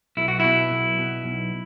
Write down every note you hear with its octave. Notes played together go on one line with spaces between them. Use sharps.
B1 E4
F#4
B2 E4
B1
B2
B1